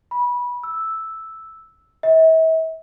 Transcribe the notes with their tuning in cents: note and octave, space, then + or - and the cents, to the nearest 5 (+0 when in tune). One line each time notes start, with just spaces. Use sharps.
B5 -20
E6 -5
E5 -40